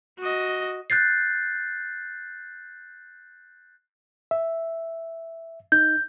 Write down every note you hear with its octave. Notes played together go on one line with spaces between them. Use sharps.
F#4 D#5
F#6 G6 A6 C7
E5
D#4 G6